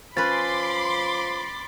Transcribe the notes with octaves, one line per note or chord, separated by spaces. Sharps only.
F3 C#4 B4 B5 C6 D6 A6